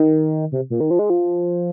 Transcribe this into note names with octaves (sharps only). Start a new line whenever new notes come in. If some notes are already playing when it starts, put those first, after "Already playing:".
Already playing: D#3
C3
A#2
D#3
F3
G#3
F3